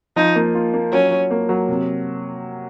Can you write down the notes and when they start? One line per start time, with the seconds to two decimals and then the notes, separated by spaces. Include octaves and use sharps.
0.16 F3 D#4
0.36 A#3
0.55 F4
0.74 A#3
0.92 F#3 C#4
1.11 F#3
1.31 A#3
1.49 F#3
1.69 C3